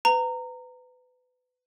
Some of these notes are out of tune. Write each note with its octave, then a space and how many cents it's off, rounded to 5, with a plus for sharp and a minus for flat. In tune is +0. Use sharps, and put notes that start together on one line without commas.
B4 +25 A#5 -20